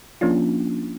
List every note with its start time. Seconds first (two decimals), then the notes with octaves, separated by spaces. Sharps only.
0.21 F3 A#3 C#4 D4 F4